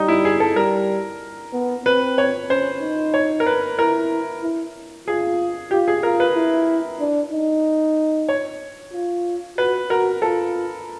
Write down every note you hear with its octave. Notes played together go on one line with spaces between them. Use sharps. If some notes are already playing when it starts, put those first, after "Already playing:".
Already playing: G3 D#4
E4
G#4
A4
G3 A#4
B3
C4 B4
C#5
C#4 C5
D#4
C#5
A#4
B4
E4 A#4
E4
F4 G#4
F4 G4
G#4
F4 A#4
B4
E4
D4
D#4
C#5
F4
F#4 B4
F#4 A#4
F4 A4